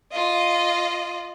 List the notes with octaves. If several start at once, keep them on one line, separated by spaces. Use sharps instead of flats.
F4 D#5